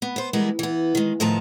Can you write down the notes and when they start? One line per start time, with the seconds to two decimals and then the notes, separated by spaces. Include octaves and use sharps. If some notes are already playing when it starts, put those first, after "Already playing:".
0.02 B3
0.16 B3 C5
0.33 E3 G3 G#3 B3 A#4
0.59 E3 B3
0.95 D#3 G#3
1.20 A2 D#3 F3 B3 A5 A#5